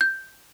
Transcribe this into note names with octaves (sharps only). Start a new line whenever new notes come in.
G6